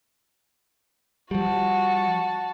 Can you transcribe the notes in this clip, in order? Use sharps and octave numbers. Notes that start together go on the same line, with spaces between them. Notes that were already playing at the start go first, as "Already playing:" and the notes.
F3 G3 F#4 A5